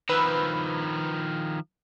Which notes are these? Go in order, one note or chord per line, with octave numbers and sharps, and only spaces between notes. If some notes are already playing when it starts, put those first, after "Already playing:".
D#3 F3 B4 E6